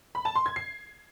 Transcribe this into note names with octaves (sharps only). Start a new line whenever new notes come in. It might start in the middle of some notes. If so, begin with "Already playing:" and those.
B5
A5
C6
G#6
C7